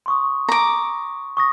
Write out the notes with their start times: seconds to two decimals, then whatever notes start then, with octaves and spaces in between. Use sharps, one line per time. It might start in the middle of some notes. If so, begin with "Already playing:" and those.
0.06 C6 C#6 D#6
0.49 A#5 D6
1.37 C#6 D#6 A#6